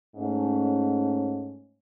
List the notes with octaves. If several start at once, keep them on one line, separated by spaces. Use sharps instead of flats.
G#2 A3 C#4